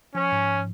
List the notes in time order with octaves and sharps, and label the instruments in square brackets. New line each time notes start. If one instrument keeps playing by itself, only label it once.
[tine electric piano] F3 [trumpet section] C#4
[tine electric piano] G#2